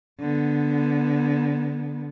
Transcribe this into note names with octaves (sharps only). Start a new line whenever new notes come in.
D3 B3